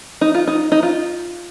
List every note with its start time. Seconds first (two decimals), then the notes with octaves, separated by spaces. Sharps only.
0.21 D#4
0.34 F4
0.47 D#4
0.72 D#4
0.83 F4